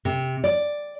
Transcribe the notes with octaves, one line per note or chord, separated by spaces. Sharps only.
C3
D5